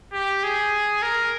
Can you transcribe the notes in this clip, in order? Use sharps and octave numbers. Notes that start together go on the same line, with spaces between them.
G4
G#4
A#4